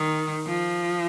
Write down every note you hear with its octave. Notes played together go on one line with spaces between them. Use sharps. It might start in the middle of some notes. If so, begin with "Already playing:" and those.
Already playing: D#3
F3